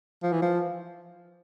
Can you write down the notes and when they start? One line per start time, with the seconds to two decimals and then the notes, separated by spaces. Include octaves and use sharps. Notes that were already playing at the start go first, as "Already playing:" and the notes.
0.23 F3
0.32 E3
0.42 F3